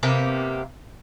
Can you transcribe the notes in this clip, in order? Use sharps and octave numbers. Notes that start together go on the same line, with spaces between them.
C3 A#3 B3 G4